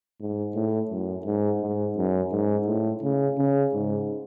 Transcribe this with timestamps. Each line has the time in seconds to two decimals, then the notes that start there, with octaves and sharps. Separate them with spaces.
0.20 G#2
0.55 A2
0.91 F#2
1.26 G#2
1.61 G#2
1.96 F#2
2.32 G#2
2.67 A2
3.03 C#3
3.38 C#3
3.74 G#2